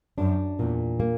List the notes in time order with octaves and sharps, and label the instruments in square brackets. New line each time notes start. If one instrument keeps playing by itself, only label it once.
[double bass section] F#2 [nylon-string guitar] D4
[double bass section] E2 [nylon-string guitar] A#2
[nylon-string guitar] A#3